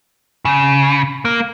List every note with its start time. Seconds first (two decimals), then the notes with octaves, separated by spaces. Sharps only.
0.45 C#3
1.25 A#3